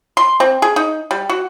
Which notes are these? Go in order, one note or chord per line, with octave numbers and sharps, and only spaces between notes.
C6
C4
G#4
D#4
G3
F#4